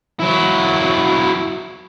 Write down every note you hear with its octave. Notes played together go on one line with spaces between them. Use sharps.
F#3 E4